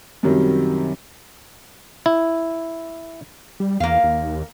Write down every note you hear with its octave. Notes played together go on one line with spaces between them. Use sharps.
F#2 C3 D#3 F#3 G3
E4
G3
E2 A#3 F5
D#2